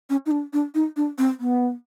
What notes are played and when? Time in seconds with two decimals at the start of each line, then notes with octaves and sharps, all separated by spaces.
0.10 C#4
0.26 D#4
0.31 D4
0.53 D4
0.75 D#4
0.97 D4
1.18 C4
1.40 B3